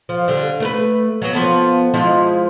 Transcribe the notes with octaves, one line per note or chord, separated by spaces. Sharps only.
F3
D3 G3
A3 A#4 B4
F#3 B3
F3 B3 A4
F3 G#3 E4